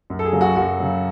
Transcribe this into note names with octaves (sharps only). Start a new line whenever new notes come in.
F#2
A4
G#4
C#3 F#3
F#4
F#2 F#4
C#3 F#3